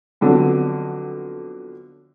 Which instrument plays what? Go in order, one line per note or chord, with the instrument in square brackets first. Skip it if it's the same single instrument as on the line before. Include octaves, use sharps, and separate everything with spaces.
[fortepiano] F2 D3 F#3 B3